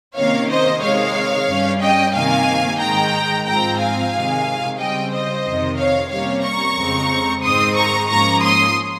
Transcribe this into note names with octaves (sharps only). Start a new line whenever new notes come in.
C3 D#3 A#3 C#4 C#5 F5
C5 D#5
C3 D#3 G#3 C#5 F5
G2 G3 C#4
D#5 G5
C3 D#3 A#3 F5 G#5
G#2 D#3 G#3 G5 A#5
G#2 F3 C4 G5 A#5
F5 G#5
C3 D#3 G#3
C#3 G3 C4 D#5 G5
C5 D#5
F2 C3 D#3
C#5 F5
C3 G3 A#3 C#4 C#5 F5
A#5 C#6
F2 C#3 G#3 C4
G#2 D#3 G#3 C4 C6 D#6
A#5 C#6
G#2 F3 A#3 C#4 A#5 C#6
C6 D#6